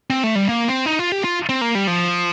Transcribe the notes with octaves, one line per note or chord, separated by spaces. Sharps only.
C4
A3
G3
A#3
C4
D#4
F4
G4
F4
C4
A#3
G3
F3